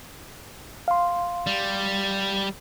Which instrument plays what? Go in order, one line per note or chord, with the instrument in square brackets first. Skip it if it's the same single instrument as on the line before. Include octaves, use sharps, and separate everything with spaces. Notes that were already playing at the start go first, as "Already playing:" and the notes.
[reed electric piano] F5 C6
[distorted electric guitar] G3